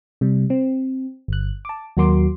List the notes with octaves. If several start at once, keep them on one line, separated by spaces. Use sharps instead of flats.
C3 G3
C4
G1 F#6
A5 D6
D#2 F#3 F#4 A#4 C6 D6